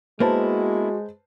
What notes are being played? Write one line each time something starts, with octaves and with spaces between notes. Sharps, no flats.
G#3 A#3 B3 E4 F#4 B4 C5 A5